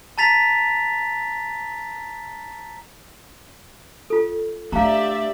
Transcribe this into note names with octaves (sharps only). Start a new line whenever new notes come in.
A5 A#5 A6 B6 F7
F4 A4
A3 D4 G4 D5 E5 F5 A#5